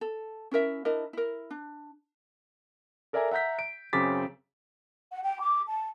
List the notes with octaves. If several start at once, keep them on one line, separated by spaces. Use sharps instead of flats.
A4
C#4 E4 A#4 E5
D4 E4 A#4 D#5
E4 A#4
D4
A4 A#4 D5 E5 G#5 A#5
E5 F#5 A#5 G6 B6
D7
F#2 C#3 C4 D6 A6 B6
F#5
G5
D6
A5